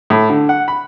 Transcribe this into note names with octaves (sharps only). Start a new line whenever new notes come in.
A2
D3
F#5
B5